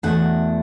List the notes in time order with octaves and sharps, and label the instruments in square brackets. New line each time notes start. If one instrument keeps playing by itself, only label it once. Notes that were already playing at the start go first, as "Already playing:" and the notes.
[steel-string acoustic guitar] E2 B2 A3 D4 F#5